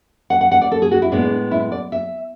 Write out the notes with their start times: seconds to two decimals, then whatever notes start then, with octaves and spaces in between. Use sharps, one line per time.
0.30 F#5
0.41 F#5
0.51 F#5
0.62 D5
0.71 A4
0.82 G#4
0.91 F#4
1.02 E4
1.12 A2 G#3 B3 D4
1.51 E4
1.72 D5
1.92 E5